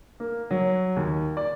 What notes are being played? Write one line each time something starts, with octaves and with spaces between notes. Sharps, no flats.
A#3
F#3
D#2
D5